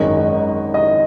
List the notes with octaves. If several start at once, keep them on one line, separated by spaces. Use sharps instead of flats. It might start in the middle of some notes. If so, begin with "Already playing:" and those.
Already playing: G#1 F#2 D#3 G#3 D#5
D#5